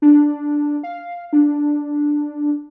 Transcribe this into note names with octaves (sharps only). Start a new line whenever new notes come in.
D4
F5
D4